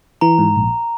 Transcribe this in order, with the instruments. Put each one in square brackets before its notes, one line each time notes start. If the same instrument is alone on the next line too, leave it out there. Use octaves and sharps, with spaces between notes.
[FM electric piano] E3 [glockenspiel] A#5
[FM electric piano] G#2
A#1